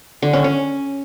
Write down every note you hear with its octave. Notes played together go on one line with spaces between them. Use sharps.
D3
C#4
C#4